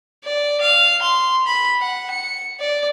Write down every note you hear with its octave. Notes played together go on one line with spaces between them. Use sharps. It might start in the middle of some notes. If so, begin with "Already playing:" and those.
D5
F5
C6
B5
F#5
C#7
D5